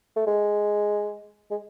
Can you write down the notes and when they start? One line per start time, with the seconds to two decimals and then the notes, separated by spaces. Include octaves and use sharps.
0.16 A3
0.27 G#3
1.51 G#3